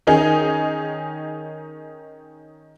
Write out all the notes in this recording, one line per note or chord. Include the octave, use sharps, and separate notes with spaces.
D#3 C#4 D#4 G#4